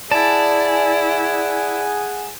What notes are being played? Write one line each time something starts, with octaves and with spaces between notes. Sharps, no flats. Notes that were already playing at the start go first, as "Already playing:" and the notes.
E4 G#4 D5 F#5 G#5 A5